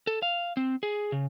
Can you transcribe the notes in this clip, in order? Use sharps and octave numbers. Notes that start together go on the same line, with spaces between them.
A4
F5
C4
G#4
C#3